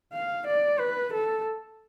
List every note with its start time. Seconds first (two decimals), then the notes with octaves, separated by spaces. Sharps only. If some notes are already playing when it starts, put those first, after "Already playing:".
0.13 F5
0.47 D5
0.79 B4
1.13 A4